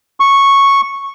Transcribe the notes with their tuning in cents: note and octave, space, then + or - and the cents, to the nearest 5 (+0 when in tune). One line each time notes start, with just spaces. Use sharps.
C#6 -5